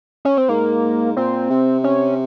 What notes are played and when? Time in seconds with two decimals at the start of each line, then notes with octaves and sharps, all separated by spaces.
0.25 C#4
0.37 C4
0.49 G#2 A#3
1.16 A#2 C4
1.50 C3
1.84 C#4